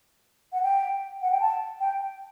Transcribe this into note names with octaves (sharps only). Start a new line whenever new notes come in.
F#5
G5
F#5
G5
A5
G5